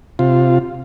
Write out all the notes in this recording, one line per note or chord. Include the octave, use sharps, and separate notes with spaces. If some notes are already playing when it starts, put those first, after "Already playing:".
C3 F4